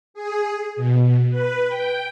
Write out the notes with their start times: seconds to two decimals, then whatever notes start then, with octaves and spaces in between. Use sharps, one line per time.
0.14 G#4
0.76 B2
1.30 B4
1.68 G5